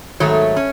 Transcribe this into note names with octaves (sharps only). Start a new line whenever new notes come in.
G#2 D#3 F#3 A3 C#5
C#4